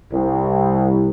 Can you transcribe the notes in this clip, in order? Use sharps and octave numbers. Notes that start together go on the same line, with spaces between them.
C2